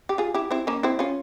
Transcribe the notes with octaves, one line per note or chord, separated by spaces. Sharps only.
G4
F4 G#4
E4 G4
C4 E4
A#3 C#4
C4 E4
C#4 F4